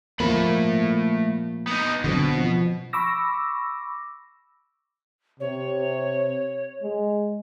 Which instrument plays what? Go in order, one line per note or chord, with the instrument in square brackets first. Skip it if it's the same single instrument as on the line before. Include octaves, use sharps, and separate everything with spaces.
[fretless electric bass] A#2 F3 A#3 [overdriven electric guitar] A3 B5
[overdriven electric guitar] B3 D#4
[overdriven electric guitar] B2 [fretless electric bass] D3 F#3 C4
[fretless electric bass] F3
[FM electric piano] B5 C#6 D6 E6 A#6
[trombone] C3 [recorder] C#5
[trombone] G#3